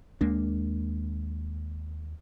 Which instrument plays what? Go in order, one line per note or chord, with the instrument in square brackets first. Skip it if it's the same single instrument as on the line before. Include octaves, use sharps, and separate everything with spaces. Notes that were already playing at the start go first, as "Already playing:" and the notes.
[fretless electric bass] D#2 G#3 A#3 D4